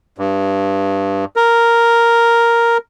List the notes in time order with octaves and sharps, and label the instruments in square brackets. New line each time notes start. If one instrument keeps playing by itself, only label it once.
[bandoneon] G2
A#4